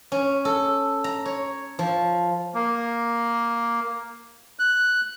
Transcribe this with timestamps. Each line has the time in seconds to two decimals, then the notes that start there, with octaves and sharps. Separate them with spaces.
0.12 C#4
0.45 A4
1.04 A#5
1.25 C#5
1.79 F3
2.55 A#3
4.59 F#6